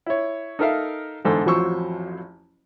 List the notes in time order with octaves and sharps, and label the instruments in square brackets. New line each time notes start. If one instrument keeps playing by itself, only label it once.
[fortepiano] E4 C#5
D#4 A4 A#4 E5 F5
E2 G#2 D3 A4 C5 E6
A1 F2 F#3 C5 C#6 E6